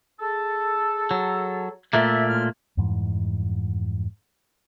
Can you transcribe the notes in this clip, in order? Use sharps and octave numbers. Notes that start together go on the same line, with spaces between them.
G#4 A4
F#3
A#2 A3 A#3 E5
A2 G#3 F6
F2 G#2 E3 G3